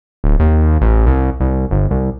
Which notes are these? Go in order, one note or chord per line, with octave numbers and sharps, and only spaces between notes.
D1
D#2
A1
C2
C2
G1
C2